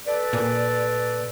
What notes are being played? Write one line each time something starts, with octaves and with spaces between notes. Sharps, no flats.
A4 B4 D5
A#2